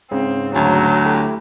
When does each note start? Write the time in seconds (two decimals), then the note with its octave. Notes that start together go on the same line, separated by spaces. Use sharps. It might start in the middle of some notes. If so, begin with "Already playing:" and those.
0.11 G#2 C#3 C4
0.55 D2 F#3
1.05 A3 E4 G4